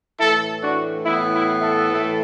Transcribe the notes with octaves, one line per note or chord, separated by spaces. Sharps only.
A2 E3 A3 E4 A4
D4 F#4
A2 E3 B3 E4
E4
E4 A4
A2 E3 A3